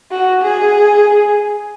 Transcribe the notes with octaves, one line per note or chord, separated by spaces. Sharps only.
F#4
G#4